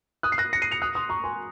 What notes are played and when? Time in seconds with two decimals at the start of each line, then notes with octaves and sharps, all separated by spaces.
0.23 D#6 F#6
0.32 C7
0.38 F#6 A#6
0.53 A#6 C#7
0.62 C7 D#7
0.71 C#7 F7
0.82 D#6 F#6
0.95 C6 D#6
1.09 A#5 C#6
1.24 G#5 C6